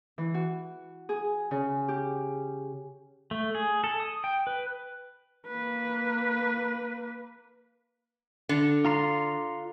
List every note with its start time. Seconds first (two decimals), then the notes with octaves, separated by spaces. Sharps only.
0.18 E3
0.34 F#4
1.09 G#4
1.51 C#3
1.88 G4
3.31 A3
3.55 G#4
3.84 A4
4.00 D#6
4.24 G5
4.47 B4
5.47 A#3 B4
8.49 D3
8.85 F4 A#5 C6